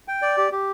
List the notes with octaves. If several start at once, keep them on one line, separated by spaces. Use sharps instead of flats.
G5
D5
G4
G4